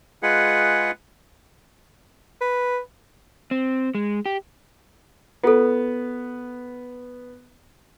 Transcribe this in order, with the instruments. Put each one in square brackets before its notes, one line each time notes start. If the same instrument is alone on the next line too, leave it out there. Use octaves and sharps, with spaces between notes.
[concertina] G#3 F4 G#4 B4 F#5
[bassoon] B4
[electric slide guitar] C4
G#3
G4
[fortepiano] B3 [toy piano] F4 A4